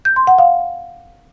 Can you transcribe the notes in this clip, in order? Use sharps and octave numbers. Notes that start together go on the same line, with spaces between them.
G6
C6
F#5
F5